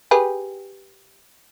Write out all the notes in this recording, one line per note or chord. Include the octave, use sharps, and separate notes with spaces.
G4 G#4 B4